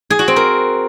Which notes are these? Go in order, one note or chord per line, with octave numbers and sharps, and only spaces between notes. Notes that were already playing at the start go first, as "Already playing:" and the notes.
G#4
F#4
C4
A#4